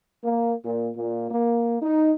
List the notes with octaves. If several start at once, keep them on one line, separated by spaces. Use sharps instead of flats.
A#3
A#2
A#2
A#3
D#4